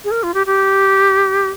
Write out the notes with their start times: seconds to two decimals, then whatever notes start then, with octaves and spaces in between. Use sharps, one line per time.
0.05 G#4
0.11 A#4
0.23 F4
0.34 G4
0.46 G4